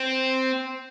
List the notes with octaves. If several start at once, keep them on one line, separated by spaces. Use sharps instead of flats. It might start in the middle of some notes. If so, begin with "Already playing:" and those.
Already playing: C4